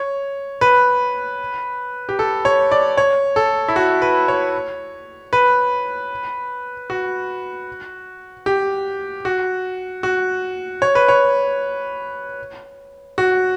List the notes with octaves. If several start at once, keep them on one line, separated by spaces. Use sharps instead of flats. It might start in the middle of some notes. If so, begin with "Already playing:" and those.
Already playing: C#5
B4
G4
A4
C#5
D5
C#5
A4
E4
F#4
B4
C#5
B4
F#4
G4
F#4
F#4
C#5
B4
C#5
F#4